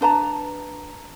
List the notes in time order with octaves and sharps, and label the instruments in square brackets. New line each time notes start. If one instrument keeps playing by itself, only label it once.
[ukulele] D4 B4 A5 A#5